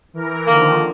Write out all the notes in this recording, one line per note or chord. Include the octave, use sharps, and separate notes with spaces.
E3 A#4
D3 D#3 F3 A#3